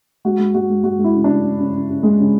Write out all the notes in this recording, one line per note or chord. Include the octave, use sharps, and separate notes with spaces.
G#3 F#4
G#3
G#3 F#4
G#3
G#3 F#4
G#3
E4
C#3
C#3 D4
C#3
C#3
C#3
C#3
G#3
C#3